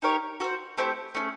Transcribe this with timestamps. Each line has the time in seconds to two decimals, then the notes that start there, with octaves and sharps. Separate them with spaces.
0.02 D#4 G4 A#4 C#5
0.40 F#4 A4
0.44 C5
0.78 A3 C4 E4 G4
1.15 A3 C#4 E4 G#4